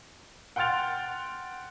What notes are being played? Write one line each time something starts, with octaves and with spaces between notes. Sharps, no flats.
F#5 G5 C6 F6 A6 F7